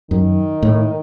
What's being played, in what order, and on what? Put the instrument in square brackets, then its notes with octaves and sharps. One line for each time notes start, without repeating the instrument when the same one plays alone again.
[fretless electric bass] F#2 [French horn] D#3
[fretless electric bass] A2